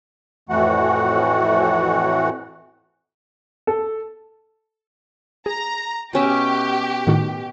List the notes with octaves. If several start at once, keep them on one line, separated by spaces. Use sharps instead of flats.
F2 A2 E3 A3 F#4 F#5
A4
G#4 A#5
B2 C#4 G4 E5
A2 D#3 F#4